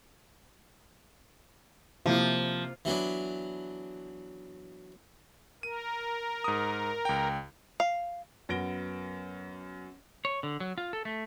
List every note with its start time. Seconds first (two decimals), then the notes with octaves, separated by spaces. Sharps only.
2.06 C3 F3 A#3 E4
2.85 E3 F#3 B3 D4
5.63 A#4 D#7
6.44 G#2 D#6
7.05 C#2 G5
7.80 F5
8.49 F#2 B3 A#6 D7 G7
10.25 C#5
10.43 D3
10.60 F#3
10.78 F4
10.93 A4
11.05 A3